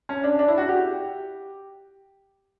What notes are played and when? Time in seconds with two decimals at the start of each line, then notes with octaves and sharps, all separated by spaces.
0.09 C#4
0.24 D4
0.39 D4
0.48 E4
0.58 F#4
0.69 G4